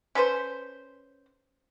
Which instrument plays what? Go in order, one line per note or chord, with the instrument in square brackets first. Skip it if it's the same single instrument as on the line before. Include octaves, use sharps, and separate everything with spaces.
[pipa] C#4 A4 B4 C5